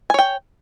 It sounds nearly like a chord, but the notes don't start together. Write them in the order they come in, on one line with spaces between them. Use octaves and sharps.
G#5 C#5 G5